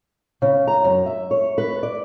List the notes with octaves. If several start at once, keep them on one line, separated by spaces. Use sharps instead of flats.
C#3
A#5
F#2
E5
C#5
B4
D5